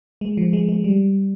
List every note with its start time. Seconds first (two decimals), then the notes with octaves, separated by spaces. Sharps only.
0.21 G#3
0.37 F3
0.53 G#3
0.69 G#3
0.84 G3